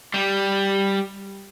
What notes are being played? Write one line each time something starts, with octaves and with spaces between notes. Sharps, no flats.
G3